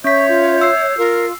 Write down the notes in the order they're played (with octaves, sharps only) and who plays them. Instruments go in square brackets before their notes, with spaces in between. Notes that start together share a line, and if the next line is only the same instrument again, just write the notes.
[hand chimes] C#4 B6 [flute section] C#5 G6 [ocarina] E5 [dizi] C#6
[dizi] F4
[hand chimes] E6 C7
[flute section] F4 [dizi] A#4